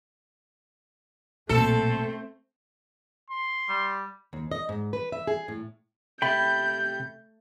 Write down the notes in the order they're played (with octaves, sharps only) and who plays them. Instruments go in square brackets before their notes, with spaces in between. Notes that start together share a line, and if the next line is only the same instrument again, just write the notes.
[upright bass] B1 A#2 [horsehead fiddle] A3 C4 [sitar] A4
[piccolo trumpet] C6
[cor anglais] G3
[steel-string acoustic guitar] D#2
D#5
G#2
B4
E5
G#4
A2
[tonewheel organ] C3 [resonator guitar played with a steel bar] A3 [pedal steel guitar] G5 B5 [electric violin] G6